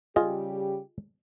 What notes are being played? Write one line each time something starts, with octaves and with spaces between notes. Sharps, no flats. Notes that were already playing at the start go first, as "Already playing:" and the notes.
C#3 G3 F4 G4 G#4 D#5